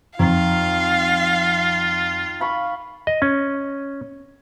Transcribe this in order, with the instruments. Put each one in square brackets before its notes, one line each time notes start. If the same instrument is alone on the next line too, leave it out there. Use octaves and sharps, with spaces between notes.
[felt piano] F2 [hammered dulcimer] D#3 [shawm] F4 [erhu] F5
[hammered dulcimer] F5 B5 C#6
[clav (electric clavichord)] D#5
C#4